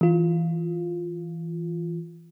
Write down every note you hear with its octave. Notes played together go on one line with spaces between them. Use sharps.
E3 F4